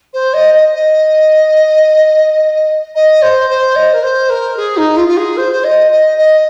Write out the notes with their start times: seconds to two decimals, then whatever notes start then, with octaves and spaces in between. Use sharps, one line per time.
0.13 C5
0.34 D#5
0.54 D#5
0.74 D#5
2.95 D#5
3.22 C5
3.50 C5
3.76 D#5
3.93 A#4
4.03 C5
4.30 A#4
4.57 G#4
4.77 D#4
4.97 F4
5.08 F4
5.17 G#4
5.37 C5
5.53 C5
5.64 D#5
5.91 D#5
6.18 D#5